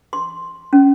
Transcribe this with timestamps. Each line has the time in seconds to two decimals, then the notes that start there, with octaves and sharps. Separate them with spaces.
0.13 C6
0.73 C#4